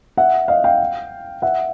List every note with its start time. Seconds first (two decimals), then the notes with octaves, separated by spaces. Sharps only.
0.17 E5 F#5
0.48 D#5 F5
0.64 F5 G5
1.42 E5 F#5